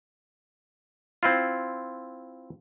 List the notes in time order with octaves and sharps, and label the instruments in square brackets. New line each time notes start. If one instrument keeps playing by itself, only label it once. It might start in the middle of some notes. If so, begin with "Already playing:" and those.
[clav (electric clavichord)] C4 E4 F4